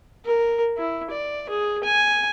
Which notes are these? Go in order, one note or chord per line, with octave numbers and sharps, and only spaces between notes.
A#4
E4
D5
G#4
G#5